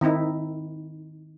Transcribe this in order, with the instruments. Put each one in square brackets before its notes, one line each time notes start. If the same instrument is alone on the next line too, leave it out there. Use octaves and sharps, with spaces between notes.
[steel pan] D#3 C4 D#4 E4